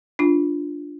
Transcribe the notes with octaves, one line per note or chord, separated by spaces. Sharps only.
D4 F4